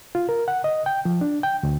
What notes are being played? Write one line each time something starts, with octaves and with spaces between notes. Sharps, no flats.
F4
A#4
F#5
D#5
G5
F3
D4
G5
D2